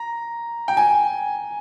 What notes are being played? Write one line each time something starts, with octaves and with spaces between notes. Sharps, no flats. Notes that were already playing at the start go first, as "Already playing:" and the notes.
Already playing: A#5
G5
G#5